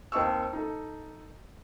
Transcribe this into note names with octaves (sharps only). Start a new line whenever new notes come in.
D#2 C4 D#5 A5 C#6 E6
D#4 A4